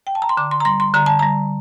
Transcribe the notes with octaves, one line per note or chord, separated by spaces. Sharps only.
G5
A5
A#5
C6
D3 D6
C6
A#5
G3 C6
C6
D3 A#5
A5
G3 A#5